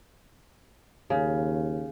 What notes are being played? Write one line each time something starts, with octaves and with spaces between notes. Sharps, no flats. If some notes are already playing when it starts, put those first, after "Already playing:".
D#2 C#3